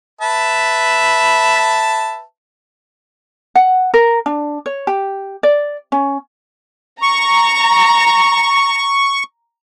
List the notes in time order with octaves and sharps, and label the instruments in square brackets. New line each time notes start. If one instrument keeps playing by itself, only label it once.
[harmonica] B4 E5 A5
[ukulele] F#5
A#4
D4
C#5
G4
D5
C#4
[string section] A#5 [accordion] C#6